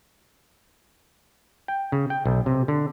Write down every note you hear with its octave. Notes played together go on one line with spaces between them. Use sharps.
G5
C#3
G5
B1
C3
D3